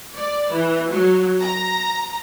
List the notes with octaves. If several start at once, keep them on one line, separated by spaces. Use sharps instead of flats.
D5
E3
F#3
A#5